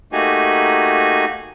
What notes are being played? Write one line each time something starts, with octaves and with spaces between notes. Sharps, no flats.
A3 A#3 D#4 F#4 G4 G#5